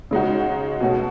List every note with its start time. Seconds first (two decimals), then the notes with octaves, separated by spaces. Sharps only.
0.11 C#3 G#3 D#4 F#4
0.80 B2 A3 C#4 F#4